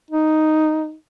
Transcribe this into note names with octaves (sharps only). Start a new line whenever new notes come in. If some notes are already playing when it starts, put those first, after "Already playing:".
D#4